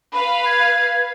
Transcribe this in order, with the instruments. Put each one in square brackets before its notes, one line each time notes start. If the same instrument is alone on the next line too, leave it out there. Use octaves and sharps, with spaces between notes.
[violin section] B4 F5 [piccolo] B5
[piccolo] G#6